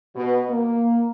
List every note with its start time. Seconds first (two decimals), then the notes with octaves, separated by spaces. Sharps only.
0.15 B2
0.50 A#3